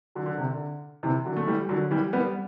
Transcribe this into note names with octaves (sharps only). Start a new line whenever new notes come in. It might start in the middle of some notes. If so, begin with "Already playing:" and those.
D3 F#3
D3
C3
D3
C3 E3
D3 F#3
A3
E3 G3
D3 F#3
E3 G3
G3 B3